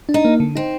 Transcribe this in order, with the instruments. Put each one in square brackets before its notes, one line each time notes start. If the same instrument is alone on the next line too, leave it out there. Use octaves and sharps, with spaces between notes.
[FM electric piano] D4
[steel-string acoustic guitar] D#4
[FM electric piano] A#3
D3
[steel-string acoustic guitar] C4 [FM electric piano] D#4